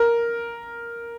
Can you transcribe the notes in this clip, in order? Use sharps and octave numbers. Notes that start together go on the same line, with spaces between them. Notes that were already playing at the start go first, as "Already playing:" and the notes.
Already playing: A#4